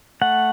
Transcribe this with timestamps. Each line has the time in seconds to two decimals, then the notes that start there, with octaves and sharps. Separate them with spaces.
0.21 A3 F#5